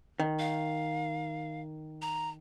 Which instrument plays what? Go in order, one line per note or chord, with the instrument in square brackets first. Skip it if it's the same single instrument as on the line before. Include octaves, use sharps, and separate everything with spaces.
[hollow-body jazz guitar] D#3
[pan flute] F5
A#5